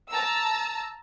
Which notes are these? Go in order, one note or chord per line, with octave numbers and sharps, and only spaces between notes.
A5 A#5 E6